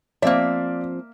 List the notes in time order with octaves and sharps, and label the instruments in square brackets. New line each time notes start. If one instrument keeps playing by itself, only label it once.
[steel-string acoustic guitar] F3 C4 [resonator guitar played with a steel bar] A#3 E5 [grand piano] D5 F5